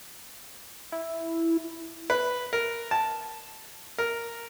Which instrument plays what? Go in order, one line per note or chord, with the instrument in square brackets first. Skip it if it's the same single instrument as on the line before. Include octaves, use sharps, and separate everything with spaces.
[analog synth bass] E4
[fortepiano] B4
A#4
A5
A#4